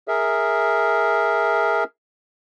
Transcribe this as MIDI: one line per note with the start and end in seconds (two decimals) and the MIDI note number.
0.08 1.84 68
0.08 1.84 70
0.08 1.84 76